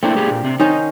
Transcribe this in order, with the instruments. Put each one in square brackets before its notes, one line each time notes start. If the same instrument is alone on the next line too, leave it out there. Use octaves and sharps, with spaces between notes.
[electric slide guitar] A3 A#3 E4 [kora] C4 D4 A#4
[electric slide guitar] A2 G4 G#4
A#2
C3 C4
[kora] D#3 C#4 C5 [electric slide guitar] D#4